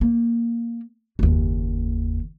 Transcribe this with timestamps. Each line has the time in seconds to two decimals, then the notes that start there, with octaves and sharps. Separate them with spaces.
0.01 A#3
1.19 F#1 D#2